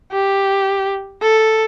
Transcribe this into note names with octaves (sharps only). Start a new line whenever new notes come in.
G4
A4